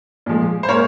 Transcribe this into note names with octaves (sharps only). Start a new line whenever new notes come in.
A#2 F3 G#3
C5
A#2 G#3 A#4 C#5